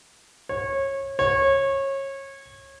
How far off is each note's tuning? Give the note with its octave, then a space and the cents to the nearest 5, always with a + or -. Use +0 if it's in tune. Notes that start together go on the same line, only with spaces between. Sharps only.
C#5 -25
C#5 -25